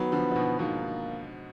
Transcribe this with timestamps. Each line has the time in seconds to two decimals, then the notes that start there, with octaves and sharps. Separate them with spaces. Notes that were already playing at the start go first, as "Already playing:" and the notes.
Already playing: D#3 F#3 B3
0.12 D3 F3
0.32 F3
0.36 B2 D#3
0.59 G#2 B2 A#3